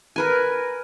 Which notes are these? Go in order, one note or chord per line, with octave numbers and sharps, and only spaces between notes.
A#4 B4 G#5